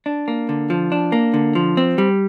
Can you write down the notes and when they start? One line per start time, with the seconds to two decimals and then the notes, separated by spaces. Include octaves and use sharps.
0.06 D4
0.28 A#3
0.49 D3
0.70 F3
0.92 D4
1.12 A#3
1.34 D3
1.55 F3
1.77 C4
1.98 G3